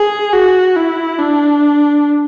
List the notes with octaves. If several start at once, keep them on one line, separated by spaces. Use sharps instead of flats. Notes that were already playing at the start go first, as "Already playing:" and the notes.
Already playing: G#4
F#4
E4
D4